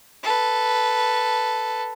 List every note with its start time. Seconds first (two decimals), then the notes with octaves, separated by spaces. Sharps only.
0.23 A4 B4